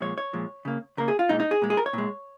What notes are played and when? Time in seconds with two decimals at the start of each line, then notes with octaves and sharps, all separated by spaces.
0.01 A#2 F3 G#3 C#5
0.18 C#5
0.33 A#2 F3 G#3
0.65 C#3 A#3
0.97 C#3 A#3 A#4
1.08 G#4
1.19 F4
1.29 A#2 G#3 D#4
1.40 D#4
1.51 G#4
1.62 A#2 G#3
1.70 G#4
1.77 A#4
1.86 C#5
1.93 A#2 G#3